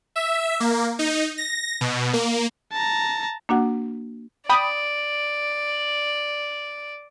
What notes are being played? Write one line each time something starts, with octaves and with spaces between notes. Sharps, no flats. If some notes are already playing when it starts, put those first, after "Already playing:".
E5
A#3
D#4
A#6
B2
A#3
A5 A#5
A#3 D4 F#4 F#5
D5 G5 B5 D#6